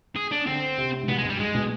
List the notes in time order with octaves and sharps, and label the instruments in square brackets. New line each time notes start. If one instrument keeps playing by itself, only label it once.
[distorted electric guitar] G#4
D4
[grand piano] D3 [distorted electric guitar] C4
[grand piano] C3
G#2
[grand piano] B2 [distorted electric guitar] B3
[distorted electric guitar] G#3
[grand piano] G2
[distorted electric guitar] G3
[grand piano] G#2 [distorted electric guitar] G#3
[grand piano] B2